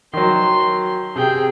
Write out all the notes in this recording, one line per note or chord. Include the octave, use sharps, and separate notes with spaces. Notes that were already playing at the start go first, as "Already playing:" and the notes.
D#3 F#3 C6
C3 G#4 G5